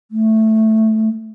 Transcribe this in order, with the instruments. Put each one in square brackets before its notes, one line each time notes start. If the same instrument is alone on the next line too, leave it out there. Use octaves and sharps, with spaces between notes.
[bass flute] A3